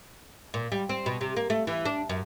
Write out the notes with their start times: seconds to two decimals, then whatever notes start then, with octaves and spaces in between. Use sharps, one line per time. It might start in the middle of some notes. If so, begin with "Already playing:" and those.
0.54 A#2
0.72 G3
0.89 C4
1.06 B2
1.21 C3
1.37 A#3
1.50 A3
1.67 E3
1.85 D4
2.09 F#2